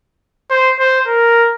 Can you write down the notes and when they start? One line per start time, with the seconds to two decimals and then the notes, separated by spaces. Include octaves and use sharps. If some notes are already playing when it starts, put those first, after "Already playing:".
0.51 C5
0.80 C5
1.07 A#4